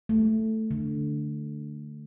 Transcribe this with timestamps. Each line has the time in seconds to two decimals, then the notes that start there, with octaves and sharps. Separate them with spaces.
0.09 A3
0.71 D3